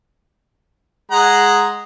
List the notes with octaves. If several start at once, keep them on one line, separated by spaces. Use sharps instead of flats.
G#3 F#5 A#5